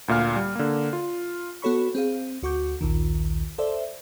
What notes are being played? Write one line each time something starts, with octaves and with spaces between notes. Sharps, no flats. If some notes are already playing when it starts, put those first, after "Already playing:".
D2 A#2 F5 F6
G3
D3 A#3
F4
B3 F#4 A4 C#5 B5 C#6
C4 G#4 F5
D2 F#4 C#6 D6 G6
A#1 D#2 D#3
A4 C5 D5 E5